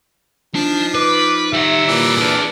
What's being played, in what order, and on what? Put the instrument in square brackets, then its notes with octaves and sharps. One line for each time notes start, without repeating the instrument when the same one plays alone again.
[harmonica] F3 [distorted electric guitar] D4 A5 [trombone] D#4
[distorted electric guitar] B4 [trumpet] D6
[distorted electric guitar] G3 F#5 [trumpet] E5
[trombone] A#2 [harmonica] E3 D5
[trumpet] D4 [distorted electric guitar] G#4 B4